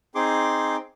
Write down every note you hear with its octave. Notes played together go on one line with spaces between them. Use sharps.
C4 D#4 G#4 C6 D6